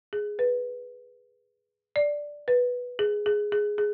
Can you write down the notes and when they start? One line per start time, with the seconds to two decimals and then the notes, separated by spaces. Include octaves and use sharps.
0.13 G#4
0.39 B4
1.96 D5
2.48 B4
2.99 G#4
3.26 G#4
3.52 G#4
3.78 G#4